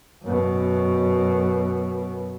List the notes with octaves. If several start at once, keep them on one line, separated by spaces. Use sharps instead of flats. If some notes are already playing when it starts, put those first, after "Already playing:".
F#2 B2